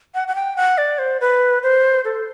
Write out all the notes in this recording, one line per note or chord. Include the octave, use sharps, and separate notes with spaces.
F#5
F#5
G5
F#5
D5
C5
B4
C5
A4